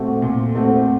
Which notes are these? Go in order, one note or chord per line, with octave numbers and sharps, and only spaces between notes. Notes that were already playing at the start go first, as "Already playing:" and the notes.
Already playing: A#2 A3 C4 F#4
A#2
A3 C4 F#4